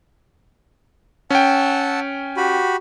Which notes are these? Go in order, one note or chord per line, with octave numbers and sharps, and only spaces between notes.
C#4 F#5 G5 A5 E6
F#4 G4 B5